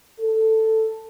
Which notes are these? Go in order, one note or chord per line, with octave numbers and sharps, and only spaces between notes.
A4